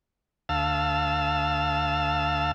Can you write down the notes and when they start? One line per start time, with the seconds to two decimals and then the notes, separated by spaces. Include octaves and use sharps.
0.49 D2 F5 A5 E6